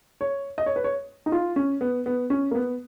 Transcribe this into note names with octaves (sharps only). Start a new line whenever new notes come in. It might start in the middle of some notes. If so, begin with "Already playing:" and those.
C#5
D#5
C#5
B4
C#5
D#4
F4
C#4
B3
B3
C#4
A#3
B3